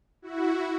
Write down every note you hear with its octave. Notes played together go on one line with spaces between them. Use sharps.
E4 F#4